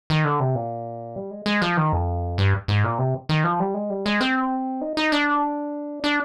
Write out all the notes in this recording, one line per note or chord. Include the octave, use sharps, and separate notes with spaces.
D#3
D3
C3
A#2
G3
G#3
G#3
F3
D#3
F2
G2
G#2
A#2
C3
D#3
F3
G3
G#3
G3
G#3
C4
D#4
D#4
D4
D4